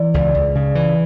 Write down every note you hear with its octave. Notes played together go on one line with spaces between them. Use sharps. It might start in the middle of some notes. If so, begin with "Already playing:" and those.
Already playing: E3 D5
C#2
C#2
C#3
E3